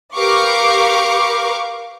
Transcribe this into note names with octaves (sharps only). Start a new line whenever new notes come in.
G4 A#4 B4 F5 C#6 D6